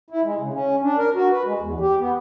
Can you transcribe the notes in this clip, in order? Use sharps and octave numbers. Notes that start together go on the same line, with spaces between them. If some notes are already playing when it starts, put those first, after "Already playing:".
E4
G#3
C#3
C#4
D4
A#4
F#4
B4
G#3
E2
G4
B3